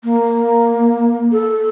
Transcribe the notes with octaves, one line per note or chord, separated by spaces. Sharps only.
A#3
A4